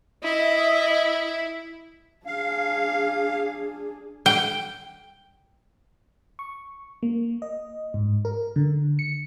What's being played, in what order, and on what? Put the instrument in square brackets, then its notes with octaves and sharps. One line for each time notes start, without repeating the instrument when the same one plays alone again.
[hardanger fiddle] E4 [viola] D#5 E5
[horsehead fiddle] D4 G#4 [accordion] F5
[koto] G5
[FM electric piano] C#6
A#3
D#5
G#2
A#4
D3
C#7